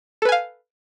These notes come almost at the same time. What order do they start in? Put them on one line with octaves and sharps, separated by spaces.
A4 B4 G#5 F5